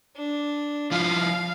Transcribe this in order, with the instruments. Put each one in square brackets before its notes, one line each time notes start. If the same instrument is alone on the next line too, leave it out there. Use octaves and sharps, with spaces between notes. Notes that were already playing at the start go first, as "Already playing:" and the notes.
[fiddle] D4
[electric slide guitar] F3 E4 F4 [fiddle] F5